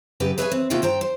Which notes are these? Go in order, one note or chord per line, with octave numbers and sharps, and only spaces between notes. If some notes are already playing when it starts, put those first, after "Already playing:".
F#2 C#3 G4 B4
G#4 B4 C#5 E5 F5 G#5
C4
C3 A#3 F4 F#4 E5 G5
G2 C5 G5 A#5
C5